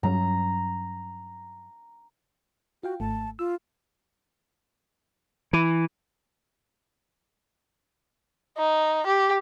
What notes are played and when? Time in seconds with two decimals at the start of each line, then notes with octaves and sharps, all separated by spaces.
0.03 G2 F#3 C#4 A#5
2.83 F4 F#4 F5 G5
3.00 G#1 A3 A5
3.39 F4 E6
5.53 E3
8.58 D#4
9.07 G4